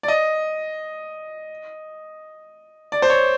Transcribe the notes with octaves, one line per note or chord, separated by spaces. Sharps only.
D5
D#5
D5
C5
C#5